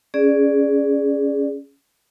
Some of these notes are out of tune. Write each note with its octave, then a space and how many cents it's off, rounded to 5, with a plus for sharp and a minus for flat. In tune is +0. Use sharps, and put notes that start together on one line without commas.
C#4 +10 G#4 +0 D5 +0